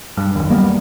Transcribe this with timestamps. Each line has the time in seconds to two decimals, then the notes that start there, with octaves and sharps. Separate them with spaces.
0.17 G2
0.35 F#1 D#2
0.50 G3 A#3 B3